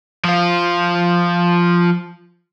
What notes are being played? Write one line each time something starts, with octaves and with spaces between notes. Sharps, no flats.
F3 F4